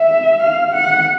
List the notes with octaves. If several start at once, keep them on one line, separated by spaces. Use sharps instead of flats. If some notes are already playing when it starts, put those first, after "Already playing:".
Already playing: E5
F5
F#5